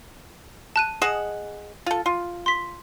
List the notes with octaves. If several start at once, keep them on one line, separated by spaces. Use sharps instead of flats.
A5 F#6 D#7
G#4 D#5 F#5 E7
F4 A4
F4
C6 B6